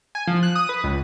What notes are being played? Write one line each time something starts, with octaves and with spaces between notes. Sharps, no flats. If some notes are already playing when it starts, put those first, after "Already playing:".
G#5
F3
F#6
D#6
B4
C#2